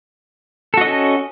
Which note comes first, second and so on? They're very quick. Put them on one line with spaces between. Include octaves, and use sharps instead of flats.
A4 F#4 D#5 C#4